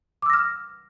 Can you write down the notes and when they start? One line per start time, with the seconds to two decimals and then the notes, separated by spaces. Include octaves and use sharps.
0.22 D6
0.26 E6
0.30 A#6
0.33 F6